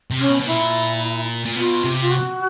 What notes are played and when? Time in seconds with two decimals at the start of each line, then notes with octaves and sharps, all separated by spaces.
0.11 C3
0.19 C#4
0.28 B2
0.40 B2
0.46 A#2 E4
1.45 A#2
1.56 B2 F4
1.84 C3
2.01 F4
2.11 F#4